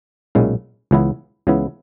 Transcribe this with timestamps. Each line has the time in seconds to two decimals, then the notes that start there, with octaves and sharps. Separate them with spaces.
0.35 B1 A#2 G#3 C#4 E4
0.91 C#2 C#3 E3 B3 E4
1.47 C#2 C#3 E3 B3 E4